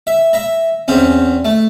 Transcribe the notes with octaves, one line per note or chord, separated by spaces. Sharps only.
E5
E5 A#5
E2 C4 C#4
A3